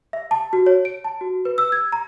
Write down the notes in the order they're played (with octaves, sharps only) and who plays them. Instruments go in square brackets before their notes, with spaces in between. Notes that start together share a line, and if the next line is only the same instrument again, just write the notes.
[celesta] E5
A5
F#4
C#5
D7
A5
F#4
B4
E6
G#6
A#5